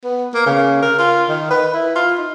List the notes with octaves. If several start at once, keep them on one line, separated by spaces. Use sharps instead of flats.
B3
A#3
C#3
A#4
F4
D#3
B4
E4
F4
D#4